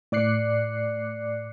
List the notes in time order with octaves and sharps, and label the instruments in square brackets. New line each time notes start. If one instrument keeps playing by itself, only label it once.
[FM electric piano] A2 D5 D6 F#6 C7 C#7